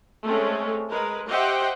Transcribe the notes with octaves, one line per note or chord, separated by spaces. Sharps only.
G#3 A3 C4 C#4 G#4
G#3 A#4 B4
G4 C5 D#5 E5 F#5 G5